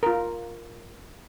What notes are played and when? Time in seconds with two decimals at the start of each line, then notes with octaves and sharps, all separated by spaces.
0.03 F4 A#4